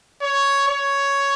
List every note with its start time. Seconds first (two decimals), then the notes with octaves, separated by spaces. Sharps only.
0.21 C#5
0.68 C#5